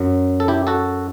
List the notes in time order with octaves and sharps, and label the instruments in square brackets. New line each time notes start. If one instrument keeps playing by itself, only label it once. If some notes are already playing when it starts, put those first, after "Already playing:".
Already playing: [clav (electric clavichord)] F#2 F#3
A4
E4 G4
F#4 A4